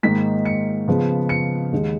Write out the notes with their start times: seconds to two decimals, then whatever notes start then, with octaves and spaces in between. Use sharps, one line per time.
0.03 G#2 D#3 A#3 D#4 B6
0.45 C#7
0.88 C#3 F3 B3
1.29 C#7
1.72 D#2 D#3 G#3